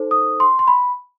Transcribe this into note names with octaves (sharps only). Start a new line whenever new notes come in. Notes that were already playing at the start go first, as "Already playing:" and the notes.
Already playing: D#4 A4 C5
D#6
C6
C6
B5